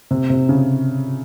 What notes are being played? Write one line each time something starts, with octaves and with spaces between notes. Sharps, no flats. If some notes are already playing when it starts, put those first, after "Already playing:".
C3
C3
C#3